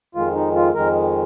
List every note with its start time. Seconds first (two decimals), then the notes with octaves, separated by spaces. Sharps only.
0.15 F2 D#3 G#3 F4
0.35 D#4
0.55 F4
0.75 F2 D#3 G#3 A#4